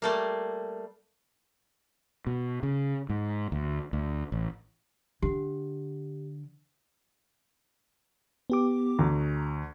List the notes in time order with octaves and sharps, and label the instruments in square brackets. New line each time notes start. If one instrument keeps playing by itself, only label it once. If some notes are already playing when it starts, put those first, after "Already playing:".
[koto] G3 A3 A#3
[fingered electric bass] B2
C#3
G#2
D2
D2
A1
[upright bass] D3 [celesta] G4
[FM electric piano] B3 G4 D6
[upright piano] D2 [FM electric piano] A#5